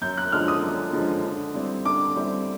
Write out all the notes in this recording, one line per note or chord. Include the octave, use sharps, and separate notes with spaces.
F#2 G6
F#6
D3 F3 G#3 F6
D#6
F#2
D3 F3 G#3
D3
G3 C4 E4
D3 D6
G3 C4 E4